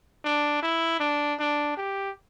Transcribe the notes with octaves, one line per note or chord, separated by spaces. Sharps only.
D4
E4
D4
D4
G4